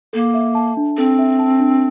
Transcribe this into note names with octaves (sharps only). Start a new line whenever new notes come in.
A#3 A4
E5
A5
D4
C4 A4
E5
A5
D4